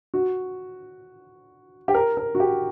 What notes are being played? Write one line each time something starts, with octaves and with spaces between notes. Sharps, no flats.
F#4
G4
A#4
A#4
F#4
G4